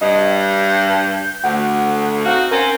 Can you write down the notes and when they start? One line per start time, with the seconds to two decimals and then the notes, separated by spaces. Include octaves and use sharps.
0.01 G2 D#5
0.41 G6
1.44 D2 F#5
2.25 C4 D#4 F#4 F5
2.51 C4 C#4 A#4